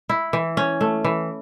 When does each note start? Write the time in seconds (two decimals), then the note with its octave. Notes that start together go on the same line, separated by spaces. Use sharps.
0.09 E4
0.33 E3
0.57 C#4
0.81 A3
1.04 E3